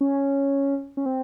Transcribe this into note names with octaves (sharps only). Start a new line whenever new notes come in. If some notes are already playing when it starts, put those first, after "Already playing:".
C#4
C#4
C4